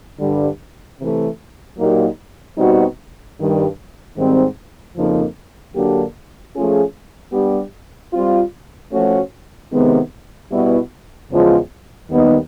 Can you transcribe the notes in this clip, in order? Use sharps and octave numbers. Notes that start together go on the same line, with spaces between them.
G2 D3 G3
C3 E3 A3
A#2 F#3 A#3 D#4 G4
B2 G3 C4 D#4 F#4
G2 D#3 G3
G#2 D#3 G3 C4
F2 C#3 F3 A#3 D#4
D3 F#3 A#3 D4 G4
F3 A3 C#4 F4 G#4
G3 B3 D4 G4
G3 C4 F4
F3 A3 C#4 F#4
C3 D#3 G#3 B3
B2 G3 B3 E4
E2 C#3 F3 G#3
D#2 D#3 G3 B3 D#4